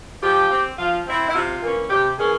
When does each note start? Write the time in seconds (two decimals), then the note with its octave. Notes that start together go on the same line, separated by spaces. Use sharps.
0.23 F3 G4
0.51 C4
0.78 F3 F4
1.07 C4 E4
1.29 E4
1.35 C3 F4
1.62 E3 A#3 C#4
1.90 C3 G4
2.18 E3 A#3 C#4 G#4